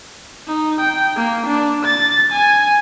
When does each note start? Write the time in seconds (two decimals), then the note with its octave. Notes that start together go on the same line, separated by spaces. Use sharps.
0.47 D#4
0.80 G5
1.16 A#3
1.46 D4
1.85 A6
2.32 G#5